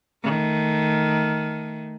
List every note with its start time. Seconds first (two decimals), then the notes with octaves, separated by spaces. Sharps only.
0.24 D#3 A3